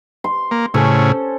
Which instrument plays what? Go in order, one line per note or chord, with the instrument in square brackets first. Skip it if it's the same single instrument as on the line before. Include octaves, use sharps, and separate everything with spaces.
[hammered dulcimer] C6
[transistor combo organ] A#3
[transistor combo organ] A2 C#3 [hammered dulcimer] C#4 A4 C5